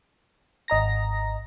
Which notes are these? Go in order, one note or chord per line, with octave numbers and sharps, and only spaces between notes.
G#1 D#5 A#5 A#6